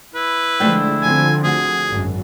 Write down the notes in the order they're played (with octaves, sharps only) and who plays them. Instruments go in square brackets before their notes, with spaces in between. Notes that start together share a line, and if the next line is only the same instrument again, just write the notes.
[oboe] E4 [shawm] B4
[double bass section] D3 F3 G#3 [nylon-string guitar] A3 D4 G5
[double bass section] D3 F3 C4 [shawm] G#5
[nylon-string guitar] D2 F#4 G#5 [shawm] G#4
[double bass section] G#1 F#2